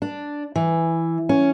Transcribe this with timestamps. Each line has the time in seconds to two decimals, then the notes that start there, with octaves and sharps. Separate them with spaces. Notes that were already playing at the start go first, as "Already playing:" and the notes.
0.02 D4
0.55 E3
1.29 C#4